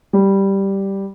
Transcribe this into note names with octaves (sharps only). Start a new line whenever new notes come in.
G3